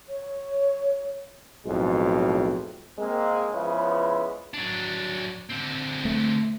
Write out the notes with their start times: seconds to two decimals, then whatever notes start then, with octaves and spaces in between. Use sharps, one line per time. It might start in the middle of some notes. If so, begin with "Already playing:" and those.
0.09 C#5
1.66 B1 F2 A2 G#3
2.99 G#3 A#3 C4
3.53 C#3 F3 G#3 B3 E4 B4
4.54 F#3 D4
5.51 D3 C4
6.05 A3